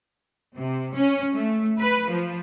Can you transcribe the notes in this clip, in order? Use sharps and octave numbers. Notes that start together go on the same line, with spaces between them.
C3
C#4
A3
B4
F3